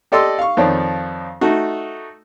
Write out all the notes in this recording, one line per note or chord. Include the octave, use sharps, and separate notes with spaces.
G4 A4 D5 D#5 C6 E6
F5 C#6
F2 D#3 F3 C#5 D5
A3 D#4 F#4